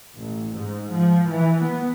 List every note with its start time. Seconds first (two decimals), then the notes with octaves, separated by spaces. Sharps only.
0.16 A1
0.53 G#2
0.93 F3
1.30 E3
1.63 B3